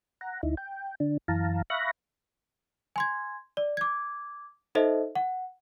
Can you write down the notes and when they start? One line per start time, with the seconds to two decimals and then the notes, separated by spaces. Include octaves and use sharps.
0.21 F#5 A#5
0.43 D2 D#4 E4
0.57 G5
1.00 D3 D4
1.28 F#2 E3 F5 A5 A#5
1.70 E5 F5 B5 C#6 F#6 A#6
2.96 G#5 C6 G#6
3.57 D5
3.77 D6 G#6
4.75 D#4 A4 C5 D#5 E5
5.15 F#5